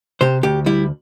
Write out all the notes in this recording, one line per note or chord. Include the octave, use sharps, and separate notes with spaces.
C3 G4 C5
D2 G4
G3 E4